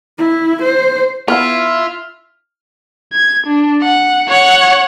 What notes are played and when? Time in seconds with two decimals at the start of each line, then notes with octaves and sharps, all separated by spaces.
0.18 E4
0.63 C5
1.28 B3 E4 F4 E5 F6
3.13 G#6
3.47 D4
3.82 F#5
4.28 C#5 F#5